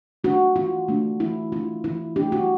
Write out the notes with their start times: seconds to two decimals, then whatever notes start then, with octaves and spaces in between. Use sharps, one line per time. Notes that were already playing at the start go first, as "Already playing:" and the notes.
0.24 A3 D4 F#4
0.56 E3 F4
0.88 A3 D4
1.20 E3 E4
1.52 A3 D4 F4
1.84 E3 E4
2.16 A3 D4 G4
2.32 F#4